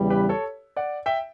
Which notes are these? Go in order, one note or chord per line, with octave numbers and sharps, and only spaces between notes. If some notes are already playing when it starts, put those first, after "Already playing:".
Already playing: E2 C#3 G3
G4 B4
A4 C#5
D5 F#5
E5 G5